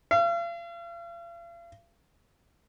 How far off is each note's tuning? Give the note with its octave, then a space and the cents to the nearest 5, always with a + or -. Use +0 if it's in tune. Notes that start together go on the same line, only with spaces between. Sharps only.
F5 -40